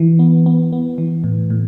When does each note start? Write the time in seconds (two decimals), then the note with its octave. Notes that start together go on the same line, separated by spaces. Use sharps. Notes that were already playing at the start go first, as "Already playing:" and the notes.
Already playing: E3
0.19 B3
0.46 B3
0.72 B3
0.98 E3
1.24 A2
1.50 A2